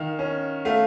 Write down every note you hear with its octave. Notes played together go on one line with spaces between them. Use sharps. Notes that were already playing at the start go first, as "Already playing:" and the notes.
Already playing: D#3 F5
C#4
A3 F5